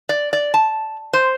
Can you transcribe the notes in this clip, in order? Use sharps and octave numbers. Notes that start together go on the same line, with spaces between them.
D5
D5
A5
C5